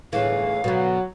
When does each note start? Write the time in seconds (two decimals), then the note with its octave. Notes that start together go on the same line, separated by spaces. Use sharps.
0.13 G1 C#2 A2 E3 G#4 F5
0.64 B2 D3 F#3 B3